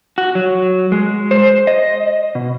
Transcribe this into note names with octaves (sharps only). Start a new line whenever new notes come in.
F#4
F#3
G#3
C5
D#5
B2